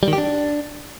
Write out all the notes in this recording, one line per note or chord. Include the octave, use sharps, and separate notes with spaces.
G3
D#3
G4
D4